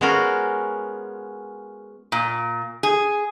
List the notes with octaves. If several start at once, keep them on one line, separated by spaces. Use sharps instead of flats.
G#3 B3 C#4 F4 F#4 A#4
A#2
G#4